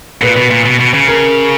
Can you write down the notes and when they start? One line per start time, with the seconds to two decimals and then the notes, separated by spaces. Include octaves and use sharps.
0.22 A#2 B4
0.37 B2
0.51 A#2
0.65 B2
0.80 B2
0.94 C#3
1.08 A#4